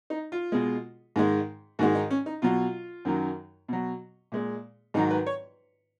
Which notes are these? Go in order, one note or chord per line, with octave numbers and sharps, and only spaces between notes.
D#4
F4
B2 G#3
G#2 D#3 G#3
G#2 D#3 G#3 F#4
D#4
C#4
D#4
B2 F#3 F4
F#2 D#3 F#3
B2 F#3
A#2 G#3
G#2 D#3 F#3 D#4
B4
C#5